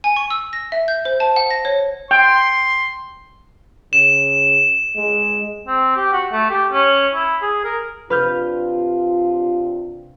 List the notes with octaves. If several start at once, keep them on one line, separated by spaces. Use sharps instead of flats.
G#5
C#6
E6
A#6
E5
G6
C5
A5
F#5
A#6
C#5
G5 C6
C#3 E7
G#3
C4
G4
F#4
A3
G4
C#4
E4
G#4
A#4
C3 D4 F4 B4 F6 G6